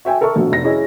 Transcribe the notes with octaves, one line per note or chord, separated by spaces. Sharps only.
F#4 E5 G5 G#5
A4 A#4 E5 A5 C#6
A#1 B2
F1 A#6
C#4 E4 G#4 D#5